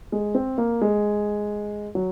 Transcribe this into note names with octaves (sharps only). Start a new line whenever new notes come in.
G#3
C4
A#3
G#3
F#3